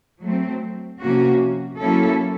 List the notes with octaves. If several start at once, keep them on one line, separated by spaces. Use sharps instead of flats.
F#3 A3 C4
C3 F3 A#3 C#4 F#4
F#3 A#3 C#4 E4 A4